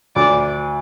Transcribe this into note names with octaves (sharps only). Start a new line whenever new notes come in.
D2 D5